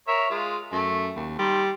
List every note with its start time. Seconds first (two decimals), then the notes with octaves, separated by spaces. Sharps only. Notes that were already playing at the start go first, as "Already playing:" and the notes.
0.08 A#4 C#5 E5
0.30 G#3 F4
0.72 F#2 A3
1.16 D#2
1.39 D#3 G3 C6